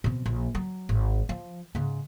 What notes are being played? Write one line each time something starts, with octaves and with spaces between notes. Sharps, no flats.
B2 C4
A#1
F#3
G#1
F3
G#2 C#3